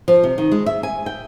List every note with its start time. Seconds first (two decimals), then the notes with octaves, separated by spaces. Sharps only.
0.08 F3
0.23 C3
0.38 D#3
0.52 G#3
0.66 E5
0.83 G#5
1.06 G5